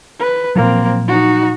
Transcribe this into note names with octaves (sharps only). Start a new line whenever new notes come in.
B4
A#2 F3 F#3 A#3 C4
D#4 F#4